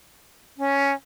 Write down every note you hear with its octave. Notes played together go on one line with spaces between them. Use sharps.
C#4